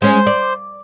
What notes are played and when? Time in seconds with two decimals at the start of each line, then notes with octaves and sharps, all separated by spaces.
0.02 G#3 C#4 C5
0.27 D5